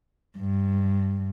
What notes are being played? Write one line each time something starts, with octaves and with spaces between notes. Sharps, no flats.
G2